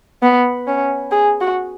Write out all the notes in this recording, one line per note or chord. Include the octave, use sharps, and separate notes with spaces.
B3
C#4
G#4
F#4